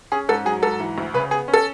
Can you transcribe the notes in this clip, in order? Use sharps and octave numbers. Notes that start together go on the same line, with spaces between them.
C#4 G#4
G#2 A4
F#3 G#4
G#2 A4
E3
D2
C#3 B4
B3 G#4
C#4
A4